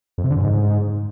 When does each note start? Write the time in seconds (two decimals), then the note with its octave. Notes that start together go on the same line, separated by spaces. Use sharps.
0.18 F2
0.24 C3
0.30 D3
0.36 F#2
0.43 G#2